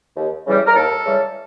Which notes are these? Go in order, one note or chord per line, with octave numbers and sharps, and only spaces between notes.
D#2
C#3 E3 G3
A#4
D#2 A4
C#3 E3 G3